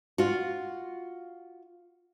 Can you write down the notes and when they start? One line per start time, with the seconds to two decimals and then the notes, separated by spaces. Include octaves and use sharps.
0.18 F4 F#4